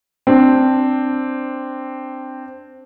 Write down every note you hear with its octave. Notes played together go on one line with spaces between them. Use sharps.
C4 D4